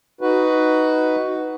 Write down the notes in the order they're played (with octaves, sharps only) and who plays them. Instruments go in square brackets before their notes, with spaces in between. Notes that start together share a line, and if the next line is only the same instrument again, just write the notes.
[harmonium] D#4 F#4 B4